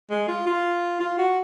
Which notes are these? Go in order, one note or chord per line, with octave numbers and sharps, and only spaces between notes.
G#3
F4
F4
F4
F#4